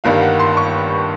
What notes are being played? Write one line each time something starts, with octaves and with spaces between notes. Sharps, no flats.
G1 G2 D#3 G3 A#3 F5
F#5
C6
C#6